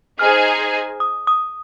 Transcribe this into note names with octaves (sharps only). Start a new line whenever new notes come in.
D#4 G#4 C5 G#5 F6
D#6
D#6